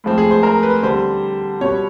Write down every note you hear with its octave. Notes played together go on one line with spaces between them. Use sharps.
A2 F3 G#3 C4
G#4
C5
A#4
B4
D3 G3 C4 C5
B2 G3 B3 C#5